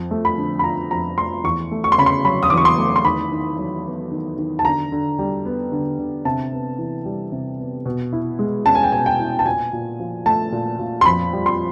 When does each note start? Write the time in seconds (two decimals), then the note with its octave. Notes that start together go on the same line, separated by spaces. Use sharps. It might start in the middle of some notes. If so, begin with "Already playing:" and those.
Already playing: F2
0.11 A3
0.25 B5
0.37 D3
0.59 B5
0.64 F3 A#5
0.91 F2 A#5
1.18 A3 C6
1.44 E2 C#6
1.71 A3
1.84 C#6
1.92 C6
1.98 C#3 B5
2.06 C6
2.25 F#3 B5
2.43 D#6
2.50 E2 D6
2.57 C#6
2.65 C6
2.78 A3
2.96 C6
3.05 D#3 B5
3.32 D#3
3.59 F#3
3.85 B3
4.11 D#3
4.38 D#3
4.59 A5
4.65 D3 A#5
4.92 D3
5.19 G3
5.45 B3
5.72 D3
5.99 D3
6.25 C3 A5
6.52 B3
6.79 E3
7.05 G3
7.32 C3
7.59 B3
7.86 B2
8.13 E4
8.39 G#3
8.66 C#4 A5
8.75 G#5
8.83 G5
8.92 B2 G#5
9.06 G5
9.19 E4
9.39 A5
9.45 A#2 G#5
9.73 A#2
9.99 F3
10.26 A3 A5
10.52 A#2
10.79 A#2
11.01 C6
11.06 F2 B5
11.33 G3
11.46 C6